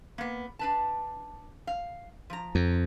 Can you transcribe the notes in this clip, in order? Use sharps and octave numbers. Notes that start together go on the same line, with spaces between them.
A#3 B3
D4 B4 A5
F5
F3 A#5
F2